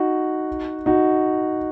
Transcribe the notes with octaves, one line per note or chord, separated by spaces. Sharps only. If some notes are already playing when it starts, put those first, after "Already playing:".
Already playing: D#4 F#4
D#4 F#4